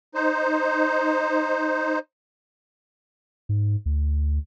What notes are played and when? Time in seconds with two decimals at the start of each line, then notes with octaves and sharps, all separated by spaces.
0.15 D#4 C5
3.49 G#2
3.86 D2